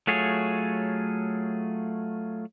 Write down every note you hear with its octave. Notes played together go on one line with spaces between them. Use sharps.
F#3 A3 F4 G#4 C#5